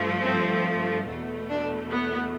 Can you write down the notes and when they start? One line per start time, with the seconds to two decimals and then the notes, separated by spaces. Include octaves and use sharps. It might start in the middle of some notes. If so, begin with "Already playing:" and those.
Already playing: G2 F3 A3
0.22 C4
1.06 E2 B2 A3
1.49 D4
1.91 B3